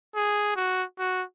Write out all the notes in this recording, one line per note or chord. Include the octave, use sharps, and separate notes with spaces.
G#4
F#4
F#4